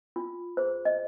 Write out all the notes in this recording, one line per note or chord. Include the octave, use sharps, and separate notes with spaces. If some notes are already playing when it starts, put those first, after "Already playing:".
F4
G#4 C5
D#5